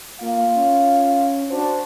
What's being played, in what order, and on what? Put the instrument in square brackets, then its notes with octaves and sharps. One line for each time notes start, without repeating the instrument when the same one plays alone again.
[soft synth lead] A#3 [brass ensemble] F4 F5
[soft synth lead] C#4
[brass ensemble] D4 F#4 C5